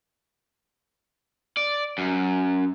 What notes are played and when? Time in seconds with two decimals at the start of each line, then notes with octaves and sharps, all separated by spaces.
1.57 D5
1.98 F#2